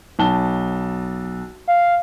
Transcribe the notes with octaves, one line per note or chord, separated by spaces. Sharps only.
B1 A5 G7
F5